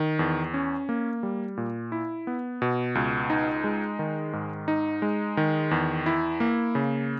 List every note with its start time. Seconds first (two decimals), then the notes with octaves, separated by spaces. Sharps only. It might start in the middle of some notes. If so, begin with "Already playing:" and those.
Already playing: D#3
0.19 E2
0.54 C#4
0.89 A#3
1.23 G3
1.57 A#2
1.92 E4
2.27 B3
2.62 B2
2.95 C#2
3.30 D#4
3.64 G#3
3.99 D#3
4.33 G#2
4.68 D#4
5.02 G#3
5.37 D#3
5.71 E2
6.06 E4
6.40 A#3
6.75 C#3